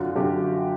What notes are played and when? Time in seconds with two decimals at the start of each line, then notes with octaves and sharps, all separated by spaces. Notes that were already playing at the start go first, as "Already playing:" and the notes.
Already playing: F#2 D3 F4 F#4
0.16 F#2 D3 G4